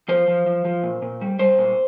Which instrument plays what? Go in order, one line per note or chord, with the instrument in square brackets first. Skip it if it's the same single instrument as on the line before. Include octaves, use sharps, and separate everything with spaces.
[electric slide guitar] F3 C5
F3
F3
F3
A#2
A#2
G3
G3 C5
A#2